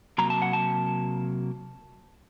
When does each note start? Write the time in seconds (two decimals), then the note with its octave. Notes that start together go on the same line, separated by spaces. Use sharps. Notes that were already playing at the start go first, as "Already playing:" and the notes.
0.18 C3 F#3 A#3 A#5
0.30 A5
0.42 F#5
0.53 A5